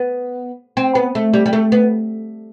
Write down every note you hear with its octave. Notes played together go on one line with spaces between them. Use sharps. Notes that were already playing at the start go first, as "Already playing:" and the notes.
Already playing: B3
C4
B3
A3
G3
G3
A3
B3